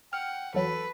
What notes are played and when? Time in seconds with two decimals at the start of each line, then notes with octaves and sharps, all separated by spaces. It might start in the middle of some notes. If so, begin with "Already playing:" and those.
0.13 F#5 G5 F6
0.54 E2 F#3 A4 B4